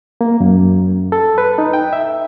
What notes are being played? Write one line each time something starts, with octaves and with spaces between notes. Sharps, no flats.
A#3
F#2
A4
B4
D#4
G5
E5